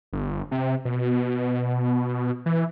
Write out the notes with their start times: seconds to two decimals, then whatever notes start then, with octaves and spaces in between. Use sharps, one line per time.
0.13 G1
0.51 C3
0.85 B2
2.46 E3